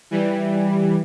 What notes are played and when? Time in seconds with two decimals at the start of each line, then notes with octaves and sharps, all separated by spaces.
0.11 E3 G3